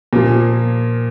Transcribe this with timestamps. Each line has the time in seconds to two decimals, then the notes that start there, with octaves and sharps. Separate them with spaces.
0.13 A#2 F3 A#3